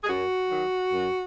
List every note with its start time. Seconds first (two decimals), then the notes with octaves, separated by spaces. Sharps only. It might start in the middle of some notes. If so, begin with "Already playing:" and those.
0.03 G#4
0.09 F#2 F#4
0.50 D#3 F#3
0.93 F#2